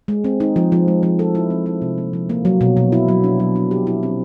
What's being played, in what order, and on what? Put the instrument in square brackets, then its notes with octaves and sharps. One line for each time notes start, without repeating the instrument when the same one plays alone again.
[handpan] G#3
C4
D#4
F3
F3
G#3
F3
A4
E4
C4
E4
C3
A#3
F3
A#3
F#3
B2
B2
E4
F#3
D4
F#3
D4
G4
E4
C4